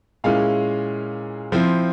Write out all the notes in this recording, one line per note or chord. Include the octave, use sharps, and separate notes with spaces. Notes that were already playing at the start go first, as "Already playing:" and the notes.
A#2 G#3 C#4 E4 F5
F3 C4 E4